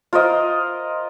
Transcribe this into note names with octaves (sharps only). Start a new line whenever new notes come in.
F4 A#4 C5 D#5